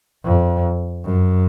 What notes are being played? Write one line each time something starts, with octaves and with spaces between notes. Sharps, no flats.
F2
F#2